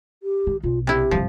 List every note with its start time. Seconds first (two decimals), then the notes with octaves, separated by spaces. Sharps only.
0.23 G4
0.47 D#3
0.63 B1 F4
0.87 C3 E4 G4
1.11 G2 C3 F3